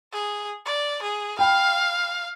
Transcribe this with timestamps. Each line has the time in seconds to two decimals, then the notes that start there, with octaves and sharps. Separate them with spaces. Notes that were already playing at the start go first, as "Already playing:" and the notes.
0.12 G#4
0.65 D5
1.02 G#4
1.39 F5 G5 B5